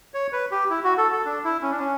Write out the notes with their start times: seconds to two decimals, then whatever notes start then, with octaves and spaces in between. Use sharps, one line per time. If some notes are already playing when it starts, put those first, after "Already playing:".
0.14 C#5
0.33 B4
0.51 G4
0.70 E4
0.84 F#4
0.98 A4
1.12 A4
1.26 D4
1.44 E4
1.62 C#4
1.71 D4
1.79 C#4